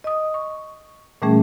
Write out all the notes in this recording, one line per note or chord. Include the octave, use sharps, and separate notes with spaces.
D#5 D#6
C#6
A#2 E3 G3 A3 C#4 G#4